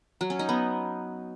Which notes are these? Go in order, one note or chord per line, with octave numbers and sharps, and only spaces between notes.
F#3
C#4
D#4
B3